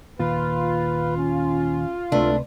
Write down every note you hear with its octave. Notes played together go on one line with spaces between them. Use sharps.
D#2 A#2 F4 B4
C#4
C#2 C3 A3 D4 B4 C6